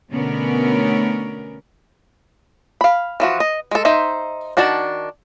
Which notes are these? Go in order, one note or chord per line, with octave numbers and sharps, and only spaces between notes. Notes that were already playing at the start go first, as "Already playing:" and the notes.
B2 D3 A3 B3 C#4 A#4
F5 B5
E3 F3 F#4
D#5
G#3 A4
D#4 C5 E5
D#3 D4 F#4 D5 A5